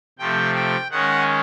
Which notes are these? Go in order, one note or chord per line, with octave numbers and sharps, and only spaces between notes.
C3 F3 A3 G5
G5
D#3 G#3 C#4 F#5